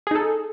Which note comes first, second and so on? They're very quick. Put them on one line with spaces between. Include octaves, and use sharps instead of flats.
G#4 D#4 A4